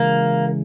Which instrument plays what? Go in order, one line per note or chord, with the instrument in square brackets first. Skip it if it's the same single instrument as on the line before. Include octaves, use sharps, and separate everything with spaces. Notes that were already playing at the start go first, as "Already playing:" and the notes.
Already playing: [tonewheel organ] C#3 E3 G#3 [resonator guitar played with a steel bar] A#3